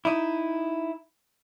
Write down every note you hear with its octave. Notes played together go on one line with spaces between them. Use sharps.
D#4 E4